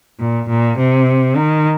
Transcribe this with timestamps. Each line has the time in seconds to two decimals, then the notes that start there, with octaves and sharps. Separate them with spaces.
0.20 A#2
0.49 A#2
0.78 C3
1.36 D#3